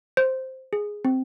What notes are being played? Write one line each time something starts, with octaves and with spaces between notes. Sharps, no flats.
C5
G#4
C4